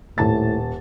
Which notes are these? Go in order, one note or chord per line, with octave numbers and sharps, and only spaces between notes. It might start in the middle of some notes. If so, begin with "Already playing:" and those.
D#1 A2 A5 A6